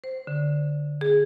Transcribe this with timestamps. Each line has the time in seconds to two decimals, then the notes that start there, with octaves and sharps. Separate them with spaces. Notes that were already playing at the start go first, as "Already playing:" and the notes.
0.04 C5
0.27 D3
1.01 G#4